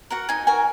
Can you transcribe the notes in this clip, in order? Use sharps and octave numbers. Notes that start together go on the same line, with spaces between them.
F#4 A#4 F#5
D#4 G#5
F#4 A#4 G#5